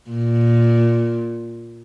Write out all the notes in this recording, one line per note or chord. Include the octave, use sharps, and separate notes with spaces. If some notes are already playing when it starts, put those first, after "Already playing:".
A#2